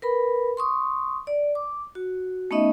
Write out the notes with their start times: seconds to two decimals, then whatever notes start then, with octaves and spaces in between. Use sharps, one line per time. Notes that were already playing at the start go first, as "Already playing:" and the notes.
0.02 A#4 B4 B5
0.57 C6 C#6 D#6
1.27 D5
1.55 D6
1.95 F#4
2.51 A3 B3 C#4 D#4 D#5 E5